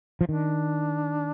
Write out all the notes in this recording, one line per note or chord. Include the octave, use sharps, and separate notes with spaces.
F3
D#3 D4